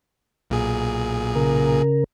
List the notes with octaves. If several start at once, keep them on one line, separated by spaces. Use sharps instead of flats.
B1 A#2 G#4
C#3 A#4